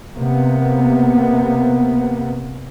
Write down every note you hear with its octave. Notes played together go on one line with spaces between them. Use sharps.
C3 A#3 B3